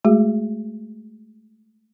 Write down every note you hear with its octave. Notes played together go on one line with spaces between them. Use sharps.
G#3 A3 F#4 G#4